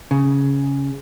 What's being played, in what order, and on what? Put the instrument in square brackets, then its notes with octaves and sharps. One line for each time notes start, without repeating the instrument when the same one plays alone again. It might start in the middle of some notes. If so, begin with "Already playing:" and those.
[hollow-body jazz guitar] C#3